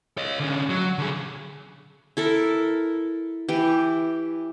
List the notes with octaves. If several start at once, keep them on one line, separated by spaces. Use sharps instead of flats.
C#5 D#5
D3 C#4
F#3
D3 G#4
E4 A4 A#4
E3 G4